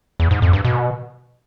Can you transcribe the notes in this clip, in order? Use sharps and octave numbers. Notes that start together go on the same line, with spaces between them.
E2
G#2
F2
G2
B2